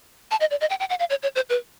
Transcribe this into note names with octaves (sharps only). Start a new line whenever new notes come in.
A5
D#5
D5
D#5
G5
G5
F#5
F5
C#5
C#5
C5
B4